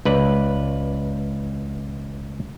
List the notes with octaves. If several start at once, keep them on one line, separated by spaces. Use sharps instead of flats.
C#2 B4 D5